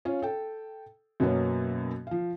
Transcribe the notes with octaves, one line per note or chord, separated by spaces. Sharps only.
C#4 F4
A4 G5
F#2 B2 F#3 A#3 B3 C#4
F3 F5